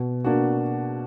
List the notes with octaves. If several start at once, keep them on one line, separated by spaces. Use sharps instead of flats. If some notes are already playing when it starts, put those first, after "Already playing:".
Already playing: B2
A#3 D4 F#4